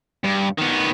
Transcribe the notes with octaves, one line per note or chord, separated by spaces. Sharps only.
G2
D#3 B3